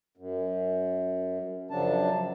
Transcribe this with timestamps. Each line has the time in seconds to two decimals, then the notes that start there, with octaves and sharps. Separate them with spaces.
0.17 F#2
1.71 F#2 C#3 F3 F#3 D4 A5